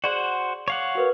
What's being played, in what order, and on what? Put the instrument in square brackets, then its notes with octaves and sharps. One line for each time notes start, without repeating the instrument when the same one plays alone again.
[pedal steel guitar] F#4 C5 F#5 [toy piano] G#4 D5
[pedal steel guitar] C#5 F5 F#5 [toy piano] D6
[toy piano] F#4 A#4 B4